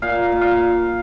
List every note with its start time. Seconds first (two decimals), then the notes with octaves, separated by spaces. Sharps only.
0.02 A#2 F5
0.32 A#2
0.41 F5